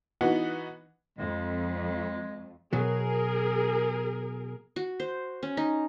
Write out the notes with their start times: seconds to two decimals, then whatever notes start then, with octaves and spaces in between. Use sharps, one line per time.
0.21 E3 B3 D#4 F#4
1.19 F2 G#3
2.73 B2 F#3 G#4 A#4
4.76 F#4
5.00 C5
5.43 C#4
5.57 D#4